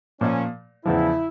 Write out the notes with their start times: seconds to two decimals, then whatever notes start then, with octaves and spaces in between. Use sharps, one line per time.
0.21 A#2 F3 A#3 C#4
0.85 E2 C#3 F3 E4